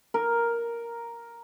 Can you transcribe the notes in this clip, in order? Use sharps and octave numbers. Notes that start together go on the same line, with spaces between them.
A#4